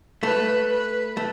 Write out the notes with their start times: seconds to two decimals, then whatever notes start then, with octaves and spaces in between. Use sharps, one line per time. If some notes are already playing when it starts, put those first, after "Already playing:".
0.23 A3 B4
0.70 B4
1.17 A3